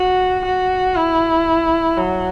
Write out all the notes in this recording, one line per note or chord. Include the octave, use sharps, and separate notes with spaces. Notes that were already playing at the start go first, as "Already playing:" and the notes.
Already playing: F#4
F#4
E4
F#3